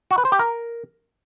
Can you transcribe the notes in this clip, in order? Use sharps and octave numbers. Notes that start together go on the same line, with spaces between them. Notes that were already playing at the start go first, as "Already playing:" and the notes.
F#4
B4
C5
G4
A#4